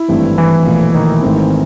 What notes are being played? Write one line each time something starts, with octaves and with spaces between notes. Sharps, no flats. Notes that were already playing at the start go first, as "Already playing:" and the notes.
Already playing: E4
G#1 G2 E3 A3 C4
E3 E4
B1 A#2 F3 A3
D#3 D#4
G#1 G#2 E3 A3 C4